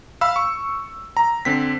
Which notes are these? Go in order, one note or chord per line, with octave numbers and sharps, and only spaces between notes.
F5 B5 E6
C#6
A#5
D3 C4 B6